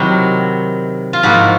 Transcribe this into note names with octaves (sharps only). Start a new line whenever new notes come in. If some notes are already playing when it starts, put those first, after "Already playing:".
Already playing: C3 D#3 F#3 E4 F#4
F4
G#2 F3 A#3 E4 F#4